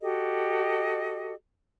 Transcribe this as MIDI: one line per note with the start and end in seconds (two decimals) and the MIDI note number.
0.01 1.34 66
0.01 1.34 67
0.01 1.34 69
0.01 1.34 75